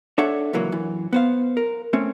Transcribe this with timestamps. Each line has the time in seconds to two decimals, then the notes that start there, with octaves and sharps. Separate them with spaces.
0.18 D4 A4 C#5 E5 F#5
0.53 C#2 E3 F#3 A#3
0.72 F#2 E3
1.13 B3 C5 F5
1.57 A#4
1.93 A3 C4 C#4